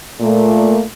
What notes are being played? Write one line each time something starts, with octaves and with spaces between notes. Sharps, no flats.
A#2 A3